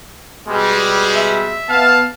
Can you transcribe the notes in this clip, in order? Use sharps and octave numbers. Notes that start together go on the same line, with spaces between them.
B2 G3 G#3
E5
B3 F5 A5